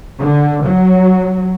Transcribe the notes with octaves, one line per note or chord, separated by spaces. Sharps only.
D3
F#3